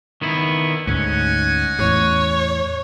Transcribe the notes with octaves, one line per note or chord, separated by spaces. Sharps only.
D#3 B3 E4
D2 G#2 C#4 D#5 F#5 G#5
E2 A2 C#5